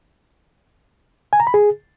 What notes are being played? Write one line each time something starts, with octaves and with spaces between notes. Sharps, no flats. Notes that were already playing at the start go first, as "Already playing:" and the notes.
G#5
A#5
B5
G#4